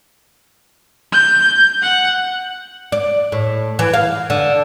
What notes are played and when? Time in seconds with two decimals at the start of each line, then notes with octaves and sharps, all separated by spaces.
1.12 G6
1.83 F#5
2.92 D5
3.32 A2
3.79 E3
3.93 F5
4.30 D3